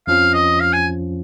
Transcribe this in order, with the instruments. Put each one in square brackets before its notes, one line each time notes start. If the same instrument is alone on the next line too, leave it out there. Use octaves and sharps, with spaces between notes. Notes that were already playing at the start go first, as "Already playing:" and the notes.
[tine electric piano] F2 F3 C#4 F4 [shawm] F5
[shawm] D#5
F5
G#5